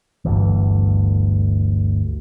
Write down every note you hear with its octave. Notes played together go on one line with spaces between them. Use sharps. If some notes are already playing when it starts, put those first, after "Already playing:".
G1 D2 E3